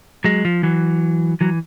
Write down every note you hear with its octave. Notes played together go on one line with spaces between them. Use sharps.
F#3 G#3
F3
E3 F#3
E3 F#3